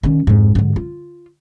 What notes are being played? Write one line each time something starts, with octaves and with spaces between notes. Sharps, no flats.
D#3 C#4
F2 G#2
G#2 D3
F4